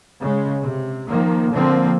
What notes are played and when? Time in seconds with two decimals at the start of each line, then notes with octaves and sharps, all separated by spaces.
0.20 C#3 G#3
0.62 C3
1.07 D#3 F3 A#3
1.52 D3 F3 A#3 C4